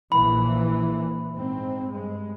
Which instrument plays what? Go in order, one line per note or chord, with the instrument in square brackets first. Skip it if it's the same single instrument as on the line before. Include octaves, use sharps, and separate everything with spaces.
[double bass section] A#1 A#2 E3 [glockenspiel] B5
[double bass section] G#2 C4
G2 G#3